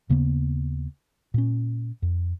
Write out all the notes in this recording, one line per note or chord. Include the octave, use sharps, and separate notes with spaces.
D#2 C#3 A#3 B3
A#2 C#4
F2